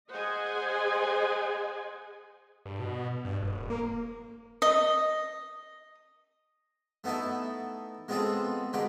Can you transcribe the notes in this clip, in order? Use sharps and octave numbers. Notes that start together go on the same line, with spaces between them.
G#4 C5 D#5 F#5 G#5
G2
B2
G2
D#1
A#3
D#5
A3 B3 D#4 E4 A4
G#3 B3 C4 F4 G#4 A4
B2 D3 G#3 A#3 G4 G5